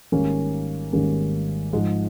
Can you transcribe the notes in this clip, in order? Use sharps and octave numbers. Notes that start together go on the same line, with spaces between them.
G#1 G#2 G3 A#3 C#4
G#1 G#2 G3 A#3 C#4
G#2 F3 G#3